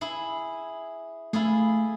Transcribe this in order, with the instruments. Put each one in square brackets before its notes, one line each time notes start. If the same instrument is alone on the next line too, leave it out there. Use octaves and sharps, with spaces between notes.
[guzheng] E4 G#4
[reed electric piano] A3 [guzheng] E4 F4 G#4